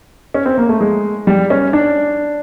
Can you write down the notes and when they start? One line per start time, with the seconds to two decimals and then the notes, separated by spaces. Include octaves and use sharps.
0.34 C#4
0.46 C4
0.58 A#3
0.69 A3
0.81 G#3
1.27 G3
1.50 C#4
1.73 D4